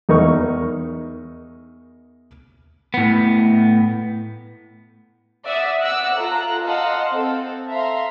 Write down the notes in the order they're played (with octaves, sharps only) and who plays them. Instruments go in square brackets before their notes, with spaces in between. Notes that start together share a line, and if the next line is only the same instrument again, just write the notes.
[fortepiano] E2 D#4 A#4 C#6
[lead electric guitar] A2 B3
[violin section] D5 E5 F#5 D#6 E6
F#5 D6 E6 F#6 A#6
F4 A4 A#5 F#6
D#5 F5 F#5 A5 C6 E6
C4 A4
E5 F5 A#5 C6